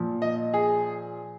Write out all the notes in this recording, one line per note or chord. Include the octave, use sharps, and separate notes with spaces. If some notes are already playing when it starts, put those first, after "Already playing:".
Already playing: A#2 F3
D#5
G#4